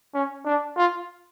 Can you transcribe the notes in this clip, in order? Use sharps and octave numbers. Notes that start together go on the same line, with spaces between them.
C#4
D4
F4